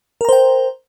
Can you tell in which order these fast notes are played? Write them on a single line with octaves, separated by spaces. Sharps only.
A#4 A#5 C5 G5